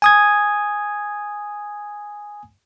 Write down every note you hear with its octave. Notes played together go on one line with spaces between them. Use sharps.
G#5 D#6 G#6